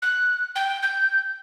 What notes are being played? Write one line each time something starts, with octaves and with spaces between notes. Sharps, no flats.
F#6
G5
G6